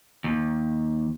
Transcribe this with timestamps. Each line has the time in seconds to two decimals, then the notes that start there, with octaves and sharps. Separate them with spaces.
0.24 D#2